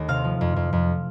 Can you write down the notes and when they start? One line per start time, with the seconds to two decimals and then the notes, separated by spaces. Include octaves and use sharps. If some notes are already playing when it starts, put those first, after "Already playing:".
Already playing: D#2 A3
0.08 C3 F5
0.24 F3
0.41 F2
0.56 F2
0.73 F2